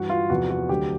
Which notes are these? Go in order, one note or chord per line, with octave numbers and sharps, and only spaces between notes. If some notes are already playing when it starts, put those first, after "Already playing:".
Already playing: G2 E3 F#4
F4
E2 C3 F3 F#4
F#4
D2 D3 F#3 G4